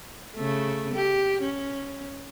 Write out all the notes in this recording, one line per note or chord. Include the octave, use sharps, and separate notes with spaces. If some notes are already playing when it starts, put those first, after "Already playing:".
C#3 A3
G4
C#4